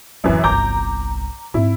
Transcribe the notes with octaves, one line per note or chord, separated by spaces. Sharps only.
D1 F#2 C3 E3
G1 C2 A#5 D6 G6
G#2 C4 E4